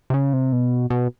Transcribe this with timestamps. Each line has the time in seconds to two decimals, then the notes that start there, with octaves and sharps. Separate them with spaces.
0.10 C3
0.14 C#3
0.33 C3
0.53 B2
0.90 B2